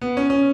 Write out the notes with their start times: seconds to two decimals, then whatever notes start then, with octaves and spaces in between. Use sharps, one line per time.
0.01 B3
0.17 C#4
0.30 C#4